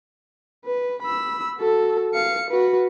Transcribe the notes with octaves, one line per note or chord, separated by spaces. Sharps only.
B4
B5 E6
F#4 A4
F5 C#7
F#4 B4